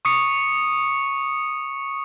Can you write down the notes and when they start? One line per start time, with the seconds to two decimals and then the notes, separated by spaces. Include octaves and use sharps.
0.05 C#6 D#6 C#7